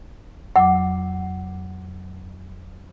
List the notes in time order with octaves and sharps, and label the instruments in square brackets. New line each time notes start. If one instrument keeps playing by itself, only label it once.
[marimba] F2 F#3 D6 [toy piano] F#5